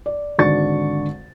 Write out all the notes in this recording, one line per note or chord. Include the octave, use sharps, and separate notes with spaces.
D5
G#1 D3 F#4 D5 C#6 A6